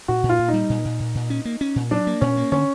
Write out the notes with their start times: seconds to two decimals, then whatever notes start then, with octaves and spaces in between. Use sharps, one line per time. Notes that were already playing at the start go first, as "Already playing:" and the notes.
0.08 A#2 F#4
0.23 A#2
0.29 F4
0.39 A#2
0.48 D#4
0.54 G3
0.70 A#2
0.85 A#2
1.00 A#2
1.15 A#2
1.30 C#4
1.45 A#3
1.61 C#4
1.76 A#2
1.91 F#3 D4
2.07 A#3
2.21 A#2 C#4
2.37 A#3
2.52 D3 C#4